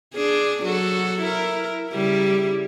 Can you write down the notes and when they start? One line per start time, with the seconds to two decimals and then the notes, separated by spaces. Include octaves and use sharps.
0.15 D4 G#4
0.63 F#3 F#4 A4
1.22 E4 A#4
1.91 C#3 G3 E4